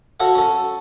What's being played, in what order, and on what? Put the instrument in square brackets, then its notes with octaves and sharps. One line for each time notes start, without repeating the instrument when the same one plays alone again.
[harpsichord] F#4 A4 C#5 F5 F#5
C#4 A4